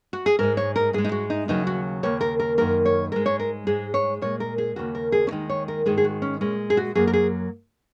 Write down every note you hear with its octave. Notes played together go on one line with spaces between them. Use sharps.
F#4
G#4
G#2 G#3 A#4
C#5
A#4
G#2 G#3 G#4
D#4
F#4
D#4
D#2 C#3 F#3 D#4
F#4
D#2 C#3 A#3 C#5
A#4
A#4
F#2 D#3 A#3 A#4
C#5
G#2 G#3 A#4
C#5
A#4
G#2 G#3 G#4
C#5
A#2 G#3 C#5
A#4
G#4
D#2 C#3 A#3 F#4
A#4
G#4
C#4
D#2 D#3 G#3 D#4
C#5
A#4
G#2 D#3 G#3 G#4
G#4
F#4
C#4
A#2 G#3 C#4
G#4
F#4
F#2 F#3 A#3 G#4
A#4
G#4